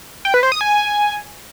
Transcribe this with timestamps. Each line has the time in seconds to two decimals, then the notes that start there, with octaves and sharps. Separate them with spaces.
0.25 G5
0.34 B4
0.43 C5
0.52 D#6
0.61 G#5